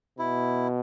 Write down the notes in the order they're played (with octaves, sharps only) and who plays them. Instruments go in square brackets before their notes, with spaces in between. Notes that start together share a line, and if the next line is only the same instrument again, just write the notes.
[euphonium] B2 [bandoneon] E4